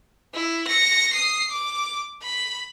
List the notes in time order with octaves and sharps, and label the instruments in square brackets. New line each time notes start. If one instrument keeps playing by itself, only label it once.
[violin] E4
A#6 C#7
D#6 C7
D6
B5